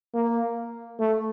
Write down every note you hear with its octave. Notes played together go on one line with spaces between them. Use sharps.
A#3
A3